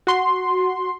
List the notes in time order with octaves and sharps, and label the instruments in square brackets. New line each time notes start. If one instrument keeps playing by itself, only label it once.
[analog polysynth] F#4 C6